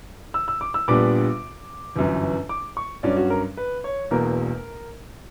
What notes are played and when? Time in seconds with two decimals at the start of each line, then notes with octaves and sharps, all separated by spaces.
0.34 E6
0.48 E6
0.61 D6
0.74 E6
0.88 A#1 A#2 G3 B3 D4 D6
1.96 G1 F#2 E3
2.49 D6
2.77 C#6
3.03 G2 F#3 C#4 D5
3.17 F#4
3.30 A#4
3.57 B4
3.84 C#5
4.11 E1 E2 B2 A#3 A#4